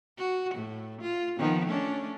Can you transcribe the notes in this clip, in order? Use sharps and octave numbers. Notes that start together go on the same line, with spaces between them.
F#4
A2
F4
D#3 F3 B3
A3 C#4 D4